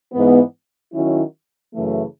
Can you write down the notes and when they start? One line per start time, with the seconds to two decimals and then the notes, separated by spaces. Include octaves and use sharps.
0.12 G#2 E3 B3
0.93 D#3 F#3 C#4 E4
1.74 F#2 C#3 E3 A3